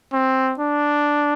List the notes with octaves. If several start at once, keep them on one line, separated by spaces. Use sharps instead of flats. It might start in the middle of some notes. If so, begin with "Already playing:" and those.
C4
D4